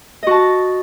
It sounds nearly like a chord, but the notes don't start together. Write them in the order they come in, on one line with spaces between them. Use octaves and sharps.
D#5 F#4 A5